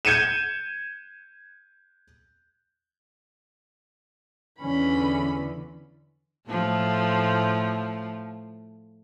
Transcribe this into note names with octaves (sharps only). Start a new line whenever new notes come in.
G6 G#6 C#7 D#7 E7
E2 D3 E3 C#4 B5
A2 F3 A3